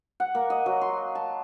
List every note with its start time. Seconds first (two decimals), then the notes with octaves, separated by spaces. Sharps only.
0.20 F#5
0.35 A#3
0.50 D#5
0.66 F#3
0.81 C6
1.15 A5